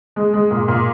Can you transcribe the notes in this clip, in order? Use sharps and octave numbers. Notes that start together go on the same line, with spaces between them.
G#3
G#3
A#2
A#2